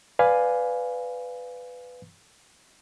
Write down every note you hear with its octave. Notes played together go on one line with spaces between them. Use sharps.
B4 D5 F5 G#5